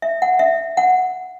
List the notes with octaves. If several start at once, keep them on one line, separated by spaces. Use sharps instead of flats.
E5
F#5
E5
F#5